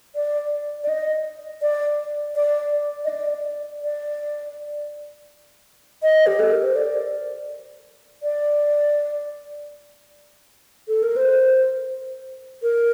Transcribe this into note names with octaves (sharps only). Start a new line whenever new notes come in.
D5
D5
D#5
D5
D5
D#5
D5
D5
D#5
G4
A4
A#4
C5
D5
D5
A4
A#4
C5
A#4